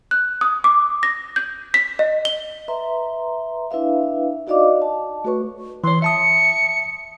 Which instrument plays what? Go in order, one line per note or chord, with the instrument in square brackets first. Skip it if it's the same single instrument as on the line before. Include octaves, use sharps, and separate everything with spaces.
[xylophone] F#6
D#6
D6
A#6
G6
B6
D#5
G7
[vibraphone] B4 E5 A#5 C6
D4 E4 B4 E5 F5
D#4 F#4 D5 D#5 F5 D6
A5
A3 F#4 A4 B4 C#5 C#6
[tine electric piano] E3 C#5 [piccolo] C6
[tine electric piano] E5 A5 D#6 [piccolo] C#7